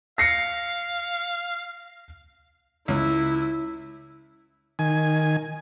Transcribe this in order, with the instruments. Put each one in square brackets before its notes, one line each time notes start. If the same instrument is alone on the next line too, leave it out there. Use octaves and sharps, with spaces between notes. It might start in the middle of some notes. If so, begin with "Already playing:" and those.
[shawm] F5 [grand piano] A#6 C7 C#7
[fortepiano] C#2 [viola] E4
[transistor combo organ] D#3 G#5